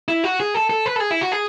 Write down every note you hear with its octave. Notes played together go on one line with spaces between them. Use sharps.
E4
F#4
G#4
A4
A4
B4
A4
G#4
E4
F#4
G#4